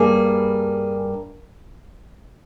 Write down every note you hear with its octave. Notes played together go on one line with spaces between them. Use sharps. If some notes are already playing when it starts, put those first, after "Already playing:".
Already playing: G2 G3 A#3 G#4